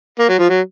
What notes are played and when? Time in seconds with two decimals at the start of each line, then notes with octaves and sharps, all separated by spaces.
0.19 A#3
0.29 F#3
0.39 F3
0.49 F#3